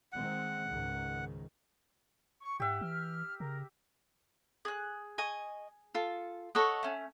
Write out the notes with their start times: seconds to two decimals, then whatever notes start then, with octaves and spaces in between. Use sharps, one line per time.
0.13 D#3 G#3 C4 F#5
0.69 C#2 G#2 D#3
2.41 C#6
2.60 G#2 G4 E5 F#5
2.81 E3 F6
3.40 C#3 A#4
4.65 G#4 F#6
5.18 D#5 G#5 C#6
5.94 F4 A4
6.55 A4 C#5 D#5 F#5 C#6
6.83 A3 C#4